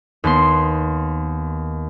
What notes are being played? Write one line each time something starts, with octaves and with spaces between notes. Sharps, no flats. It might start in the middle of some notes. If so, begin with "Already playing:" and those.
D#2 B3 C6